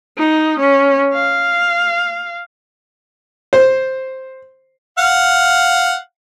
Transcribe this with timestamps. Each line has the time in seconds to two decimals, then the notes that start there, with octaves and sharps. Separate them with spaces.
0.18 D#4
0.60 C#4
1.14 F5
3.53 C5
4.98 F5 F#5